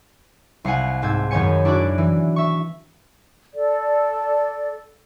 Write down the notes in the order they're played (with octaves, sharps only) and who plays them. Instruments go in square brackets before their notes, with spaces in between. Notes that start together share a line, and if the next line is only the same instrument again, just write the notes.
[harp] C2 F5 F#5 G#5
G#2 C4 A4 G#6
F#2 D#3 B3 C#5 G#5 C#7
D4 E4 F#4 D5
E3
E5 C#6
[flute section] A4 D5